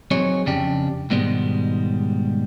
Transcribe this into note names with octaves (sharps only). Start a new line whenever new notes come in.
F#3 C4 D#4 G#4 C#5
F2 C#3 D4 G4
G#2 B2 D#3 G3 G#3